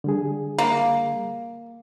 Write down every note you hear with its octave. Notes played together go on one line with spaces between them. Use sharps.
D3 G3 G#4
A#3